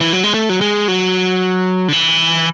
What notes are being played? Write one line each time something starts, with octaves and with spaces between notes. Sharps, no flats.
E3
F#3
G#3
A3
F#3
G#3
F#3
D3
E3